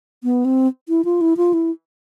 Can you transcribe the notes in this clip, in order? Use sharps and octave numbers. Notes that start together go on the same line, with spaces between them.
B3
C4
E4
F4
E4
F4
E4